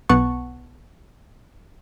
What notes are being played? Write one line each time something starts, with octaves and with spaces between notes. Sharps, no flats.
B1 B3 F#5 A5 C#6